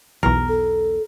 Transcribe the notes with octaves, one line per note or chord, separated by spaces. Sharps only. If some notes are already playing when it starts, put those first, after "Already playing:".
B1 E2 A#4
A4